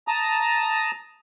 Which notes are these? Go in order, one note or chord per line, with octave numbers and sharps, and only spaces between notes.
A5 A#5 D#6